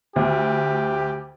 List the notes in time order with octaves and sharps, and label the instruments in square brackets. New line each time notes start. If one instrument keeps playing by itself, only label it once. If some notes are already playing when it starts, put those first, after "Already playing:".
[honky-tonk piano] D2 [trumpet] G4